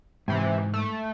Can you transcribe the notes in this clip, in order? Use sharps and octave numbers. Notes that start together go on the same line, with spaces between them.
G#2 C3 E3
A3